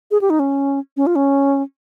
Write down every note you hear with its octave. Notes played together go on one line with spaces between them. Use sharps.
G#4
G4
D#4
C#4
C#4
F4
C#4